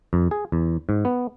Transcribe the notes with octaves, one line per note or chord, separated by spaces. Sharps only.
F2
G#4
E2
G#2
B3